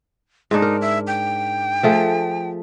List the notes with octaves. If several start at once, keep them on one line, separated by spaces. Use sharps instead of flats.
G#2 D4 D#4
A#4
E5
G5
F3 A3 G#4